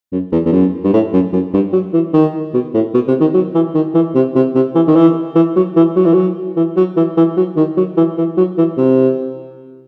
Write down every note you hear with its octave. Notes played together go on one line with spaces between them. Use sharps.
F#2
E2
E2
F#2
G2
A2
F#2
F#2
G2
F#3
E3
D#3
B2
A2
B2
C3
D#3
F#3
E3
D#3
E3
C3
C3
C3
E3
D#3
E3
E3
F#3
E3
F#3
E3
F#3
E3
F#3
E3
E3
F#3
D#3
F#3
E3
E3
F#3
E3
C3